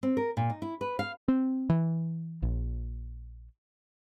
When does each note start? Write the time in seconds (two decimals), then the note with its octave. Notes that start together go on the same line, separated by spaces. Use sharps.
0.03 C4
0.17 A#4
0.37 A#2
0.50 D#4
0.62 E4
0.81 B4
0.99 F5
1.28 C4
1.69 E3
2.42 A#1